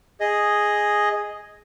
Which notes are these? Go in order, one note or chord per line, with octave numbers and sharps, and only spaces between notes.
G#4 D#5